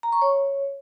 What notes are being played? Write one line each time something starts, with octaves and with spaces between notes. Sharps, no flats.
A#5
C#6
C#5